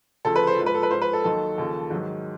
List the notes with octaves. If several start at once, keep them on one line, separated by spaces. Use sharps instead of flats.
D2 C#3 F3 A4
B4
C5
G#2 F3
B4
A4
B4
G#2 F3 C5
B4
A4
D#2 D#3 F#3 A4
D#2 C#3 F3
G#2 D#3 F#3